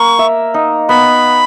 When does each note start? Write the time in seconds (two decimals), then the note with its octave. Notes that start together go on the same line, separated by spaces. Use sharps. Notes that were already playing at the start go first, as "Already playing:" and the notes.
Already playing: A#3 A#4 C#6
0.19 E5
0.54 D#4
0.89 B3 B5